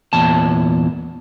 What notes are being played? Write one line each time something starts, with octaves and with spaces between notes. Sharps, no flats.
E2 A#2 A5